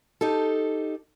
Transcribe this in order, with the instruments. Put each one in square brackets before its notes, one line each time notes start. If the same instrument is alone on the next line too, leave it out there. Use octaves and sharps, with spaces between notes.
[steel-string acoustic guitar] D#4 G4 A4